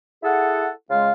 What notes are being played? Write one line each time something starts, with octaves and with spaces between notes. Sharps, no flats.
E4 G#4 A4 F#5
C#3 G#3 F4 F5